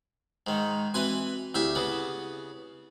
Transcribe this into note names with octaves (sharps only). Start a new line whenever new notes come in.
G#2 D#3
E3 C4 F#4 B4 G#5
D2 E4 G4 E5 F5
C#3 B3